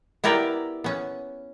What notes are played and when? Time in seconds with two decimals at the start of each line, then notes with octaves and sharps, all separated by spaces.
0.24 B3 E4 G4 A#4 D5 G5
0.84 B3 C#4